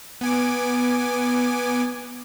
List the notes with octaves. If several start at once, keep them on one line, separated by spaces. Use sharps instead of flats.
B3 G#5 D6